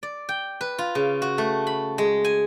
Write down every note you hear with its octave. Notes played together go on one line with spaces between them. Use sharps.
D5
G5
B4
F4
C#3
F#4
A3
B5
G#3
G#5